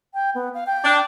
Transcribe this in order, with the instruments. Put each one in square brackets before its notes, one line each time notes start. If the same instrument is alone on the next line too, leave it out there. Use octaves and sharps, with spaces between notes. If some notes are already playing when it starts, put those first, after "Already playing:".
[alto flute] G5
B3
F5
G5
[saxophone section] D4